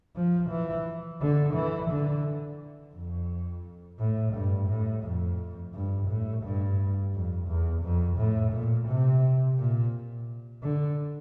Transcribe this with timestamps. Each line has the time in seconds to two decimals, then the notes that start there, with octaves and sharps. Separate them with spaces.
0.16 F3
0.50 E3
1.21 D3
1.55 E3
1.91 D3
2.94 F2
3.99 A2
4.34 G2
4.69 A2
5.04 F2
5.74 G2
6.09 A2
6.44 G2
7.14 F2
7.49 E2
7.83 F2
8.18 A2
8.53 A#2
8.88 C3
9.58 A#2
10.63 D3